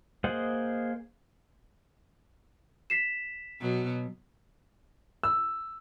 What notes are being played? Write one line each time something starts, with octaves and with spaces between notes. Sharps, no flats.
A#3 G#4 C5 D#5 F#5
B6 C7 E7
B2 F#3
E6